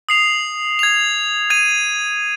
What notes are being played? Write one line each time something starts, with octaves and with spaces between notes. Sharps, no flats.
D#6 C7 F7
G#6 F7
G#6 D#7